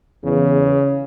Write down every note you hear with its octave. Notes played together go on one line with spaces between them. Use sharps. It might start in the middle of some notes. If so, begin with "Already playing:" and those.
E2 C#3